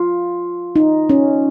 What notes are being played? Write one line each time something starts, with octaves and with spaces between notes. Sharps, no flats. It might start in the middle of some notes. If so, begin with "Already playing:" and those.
Already playing: F4
D#4
C#4